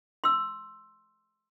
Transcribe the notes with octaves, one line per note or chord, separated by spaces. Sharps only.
C6 E6